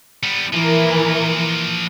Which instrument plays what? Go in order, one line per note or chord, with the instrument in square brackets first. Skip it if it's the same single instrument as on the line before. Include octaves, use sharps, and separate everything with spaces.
[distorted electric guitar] G3 B3
[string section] E3 A#4 [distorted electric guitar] F3 A#3